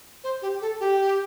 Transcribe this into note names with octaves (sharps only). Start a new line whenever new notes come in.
C5
G4
A4
G4